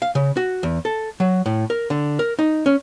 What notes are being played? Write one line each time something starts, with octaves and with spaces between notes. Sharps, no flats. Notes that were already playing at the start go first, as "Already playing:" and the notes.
F5
C#3
F#4
E2
A4
F#3
A2
A#4
D3
A#4
D#4
C#4